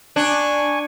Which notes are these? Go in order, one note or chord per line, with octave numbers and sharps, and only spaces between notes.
D4 G#5 C#6